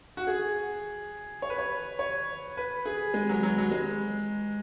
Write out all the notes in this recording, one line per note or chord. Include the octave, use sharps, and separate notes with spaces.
F#4
G#4
C#5
B4
C#5
C#5
B4
G#4
G#3
F#3
F#3
F#3
G#3